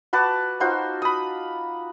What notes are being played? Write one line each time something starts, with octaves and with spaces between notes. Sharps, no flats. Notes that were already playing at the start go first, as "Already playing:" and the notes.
F#4 B4 A5 D6
D#4 F4 F#4 C5
B5 D#6